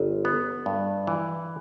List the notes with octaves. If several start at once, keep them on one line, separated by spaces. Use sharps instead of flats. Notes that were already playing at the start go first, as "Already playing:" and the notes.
Already playing: G1
B3
G2
E3